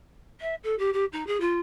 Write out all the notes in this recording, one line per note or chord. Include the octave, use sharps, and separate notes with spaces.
E5
A4
G4
G4
D#4
G#4
F4